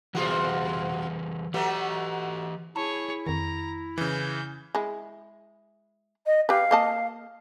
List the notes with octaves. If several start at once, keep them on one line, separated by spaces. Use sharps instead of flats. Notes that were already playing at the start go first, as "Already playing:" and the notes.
B2 E3 G3 F4 F#4 G#4
E3 F#3 A3 B3 G4
E4 G#4 C#5 A5
F2 D#3 A#5
C#3 E3 G6
G#3 E4
D#5
G4 B4 F5
A#3 D#5 A5